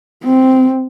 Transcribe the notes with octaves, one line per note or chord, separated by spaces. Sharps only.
C4